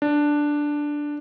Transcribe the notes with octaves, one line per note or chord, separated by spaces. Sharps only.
D4